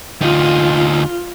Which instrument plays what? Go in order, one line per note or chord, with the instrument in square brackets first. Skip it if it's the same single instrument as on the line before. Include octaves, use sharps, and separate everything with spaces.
[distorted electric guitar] D2 D#4 [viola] F4